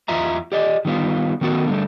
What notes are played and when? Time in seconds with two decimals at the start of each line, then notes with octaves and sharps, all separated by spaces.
0.08 E2 E3 F4 E5 A#5
0.52 G4 D5 D#5
0.85 D#3 G3 B3 F4
1.41 D#3 A3 B3 F#4 A4
1.67 D3 G3 A3